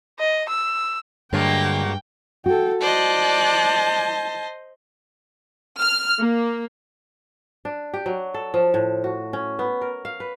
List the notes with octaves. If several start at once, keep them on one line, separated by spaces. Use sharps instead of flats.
D#5
E6
G2 D3 F#3 G#3 A#3 G5
F#4 A4 G5
C5 D5 D#5 A5 F#6
F6
A#3
D4
G4
F#3
A4
F3
A2
F#4
C#4
B3
A#4
F5
B4